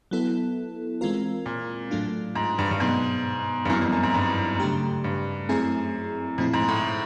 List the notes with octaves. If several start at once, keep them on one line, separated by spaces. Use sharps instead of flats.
F#3 B3 E4 A4
E3 G#3 C4 F4 A#4
A#2
A2 F#3 A3 D4 F4
G#2
G2
G2
G#2 B2 F#3 B3 D#4
G2
F#2 G3 B3 E4
F2
F#2
G#2
G2
C#3 F#3 A3 D4 G4
G2
F#2 A3 C4 E4 G#4
F2 A#2 F3 A3 C4 E4
G#2
A2